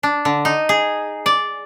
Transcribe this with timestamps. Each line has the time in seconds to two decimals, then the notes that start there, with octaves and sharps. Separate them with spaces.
0.03 D4
0.25 D3
0.45 D#4
0.69 G#4
1.26 D5